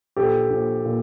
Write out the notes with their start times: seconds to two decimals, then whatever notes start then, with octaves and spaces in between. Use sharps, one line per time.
0.16 A#1 G4 A4
0.50 A#1
0.85 A#2